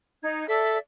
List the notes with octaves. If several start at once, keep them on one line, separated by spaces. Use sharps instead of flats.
D#4 G#6
A4 D5 E5